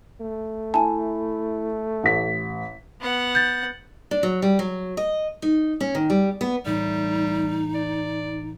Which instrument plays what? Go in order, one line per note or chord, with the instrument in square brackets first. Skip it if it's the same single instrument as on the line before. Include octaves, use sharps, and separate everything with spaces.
[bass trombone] A3
[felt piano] E4 [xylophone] G#5 A5
[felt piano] A1 B6
[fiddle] B3 F#5
[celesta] G6 A6
[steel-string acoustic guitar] D4
F#3
G3
F#3
D#5
D#4
C#4
D#3
G3
B3
[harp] A2 E3 [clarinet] G3 [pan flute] D#4
[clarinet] D5